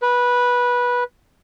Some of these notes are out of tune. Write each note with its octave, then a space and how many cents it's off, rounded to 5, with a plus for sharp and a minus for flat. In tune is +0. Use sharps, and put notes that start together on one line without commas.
B4 -15